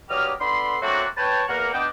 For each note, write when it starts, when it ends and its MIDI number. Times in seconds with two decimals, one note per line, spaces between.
0.10 0.32 43
0.10 0.32 54
0.10 0.32 58
0.10 0.32 67
0.10 0.32 75
0.10 0.32 89
0.41 0.78 59
0.41 0.78 62
0.41 0.78 69
0.41 0.78 83
0.41 0.78 84
0.82 1.06 54
0.82 1.06 57
0.82 1.06 58
0.82 1.06 60
0.82 1.06 62
0.82 1.06 66
1.17 1.43 71
1.17 1.43 73
1.17 1.43 79
1.17 1.43 81
1.48 1.69 40
1.48 1.69 58
1.48 1.69 70
1.48 1.69 78
1.73 1.87 59
1.73 1.87 62
1.73 1.87 75
1.73 1.87 79